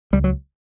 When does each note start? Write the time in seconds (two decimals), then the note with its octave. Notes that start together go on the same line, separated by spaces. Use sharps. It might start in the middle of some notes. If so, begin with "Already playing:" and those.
0.13 C#2 G3
0.24 F#3